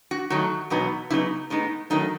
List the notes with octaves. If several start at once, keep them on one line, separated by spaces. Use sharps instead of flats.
F#4
D#3 F#3 A3 D#4 F#4
E2 B2 F#3 B3 D#4
C#3 F#3 B3 D#4 E4
A2 G#3 B3 D#4
D#3 F#3 A3 D#4